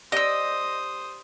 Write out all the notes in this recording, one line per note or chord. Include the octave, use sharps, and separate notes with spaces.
G4 C5 D5 D#5 D#6 E6